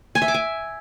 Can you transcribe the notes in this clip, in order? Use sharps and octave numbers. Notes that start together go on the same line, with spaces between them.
G#5
E5
D6
G#5